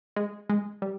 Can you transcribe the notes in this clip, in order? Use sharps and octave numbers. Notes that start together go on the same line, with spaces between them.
G#3
G#3
G3